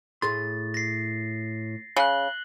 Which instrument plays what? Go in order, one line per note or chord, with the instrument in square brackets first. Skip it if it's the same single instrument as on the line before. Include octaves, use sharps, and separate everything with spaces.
[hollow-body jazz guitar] A2 G#4 C6 [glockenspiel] A6
[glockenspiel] A#6 C7
[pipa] C#3 [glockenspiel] F#6 F#7 G7